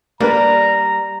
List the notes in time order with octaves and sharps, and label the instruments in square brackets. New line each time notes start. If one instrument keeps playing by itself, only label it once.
[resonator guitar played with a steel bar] G3 [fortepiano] A#3 D4 B4 [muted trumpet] A#5